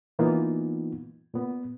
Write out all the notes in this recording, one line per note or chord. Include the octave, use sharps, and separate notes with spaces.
A#2 E3 A#3 B3 D#4 F4
A#2 B3